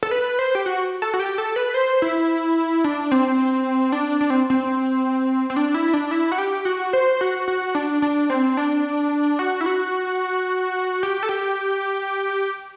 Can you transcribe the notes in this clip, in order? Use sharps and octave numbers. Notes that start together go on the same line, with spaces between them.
A4
B4
C5
G4
F#4
A4
F#4
G4
A4
B4
C5
E4
D4
C4
D4
D4
C4
C4
C4
D4
E4
D4
E4
F#4
G4
F#4
C5
F#4
F#4
D4
D4
C4
D4
F#4
E4
F#4
G4
A4
G4